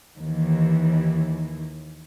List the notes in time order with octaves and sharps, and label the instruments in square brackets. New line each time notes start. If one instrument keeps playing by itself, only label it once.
[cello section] D#2 E3